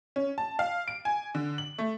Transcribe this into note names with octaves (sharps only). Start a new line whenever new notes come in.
C#4
A5
F5
D7
G#5
D3
F#7
A3